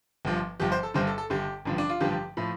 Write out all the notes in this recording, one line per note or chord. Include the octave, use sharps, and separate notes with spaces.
G1 G2 F3
G1 G2 F3 G4
C5
A4
G1 G2 D3 C5
A4
A4
G1 G2 D3 G4
A1 G2 D3 F3
D4
F4
A1 G2 D3 F3 G4
A2 F3